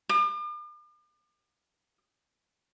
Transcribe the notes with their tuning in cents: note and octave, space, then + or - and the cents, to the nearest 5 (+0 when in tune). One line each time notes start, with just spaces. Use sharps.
D6 +45